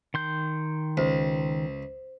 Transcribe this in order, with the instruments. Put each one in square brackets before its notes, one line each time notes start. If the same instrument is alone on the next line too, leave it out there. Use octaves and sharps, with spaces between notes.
[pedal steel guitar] D#3 C6 G6
[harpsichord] C#2 [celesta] C5